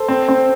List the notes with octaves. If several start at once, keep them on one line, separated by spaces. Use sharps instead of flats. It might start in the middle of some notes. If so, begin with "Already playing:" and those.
Already playing: A4 C5
C4
C4